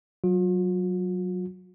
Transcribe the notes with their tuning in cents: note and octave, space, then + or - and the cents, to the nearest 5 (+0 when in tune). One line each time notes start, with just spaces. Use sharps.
F#3 +0 F4 +45